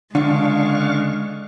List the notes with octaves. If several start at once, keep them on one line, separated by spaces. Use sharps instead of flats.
C#2 D3 G#3 D4 F5 C#6